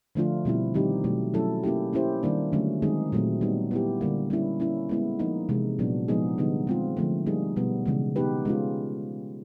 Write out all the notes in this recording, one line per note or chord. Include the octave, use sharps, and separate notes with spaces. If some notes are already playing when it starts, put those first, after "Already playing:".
D3 F3 A3 D4 F4
B2 G3 C4 E4
D#3 G3 C4 D#4 G4
B2 F#3 A3
F#3 A3 C#4 E4 A4
A#3 C#4 E4 G4
A#3 C#4 E4 G4 C5
D#3 G3 A#3 D4
D3 F#3 A3 C#4
D#3 G#3 C4 D#4 G#4
A#2 F#3 A3 C4
G3 B3 D#4
B3 E4 G4
D3 G3 A#3
G3 A#3 C#4 E4
A#3 C#4 E4
G#3 B3 E4
F3 A#3 D#4
C3 E3 G#3
A#2 F#3 B3 D4
F3 G#3 B3 D#4 G#4
D3 G3 B3 D#4
G#3 C4 F4
D3 F3 A3
G3 A#3 D#4 G#4
B2 G3 B3
C#3 E3 G#3
B3 D#4 G4 B4
G#3 C#4 F4